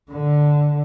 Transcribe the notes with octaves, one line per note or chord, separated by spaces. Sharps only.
D3